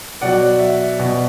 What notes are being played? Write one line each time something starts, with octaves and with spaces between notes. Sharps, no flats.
B2 F#3 D5 F#5
E5
B2 F#3